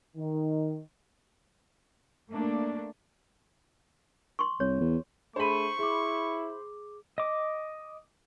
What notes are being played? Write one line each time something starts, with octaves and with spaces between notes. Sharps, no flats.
D#3
A3 A#3 D4
C6 C#6
C2 C#5
E2
A3 D4 G#4 C5 B5 C#6 D#7
E4 G#4 D6
D#5 D6